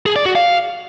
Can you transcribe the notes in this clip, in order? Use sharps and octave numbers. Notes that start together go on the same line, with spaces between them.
G#4
D5
F#4
F5